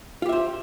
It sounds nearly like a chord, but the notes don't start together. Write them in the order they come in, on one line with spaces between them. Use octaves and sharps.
F4 G4 E5 C5